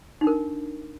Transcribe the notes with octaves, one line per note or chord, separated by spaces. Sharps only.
D4 D#4 A#4